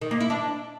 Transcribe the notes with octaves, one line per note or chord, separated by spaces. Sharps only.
D#3
A#3
E4
D4